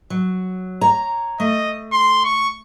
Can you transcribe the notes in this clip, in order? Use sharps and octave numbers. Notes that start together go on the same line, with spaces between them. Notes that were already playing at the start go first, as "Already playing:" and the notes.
F#3
C#5 A#5
A3 D#5
C6
C#6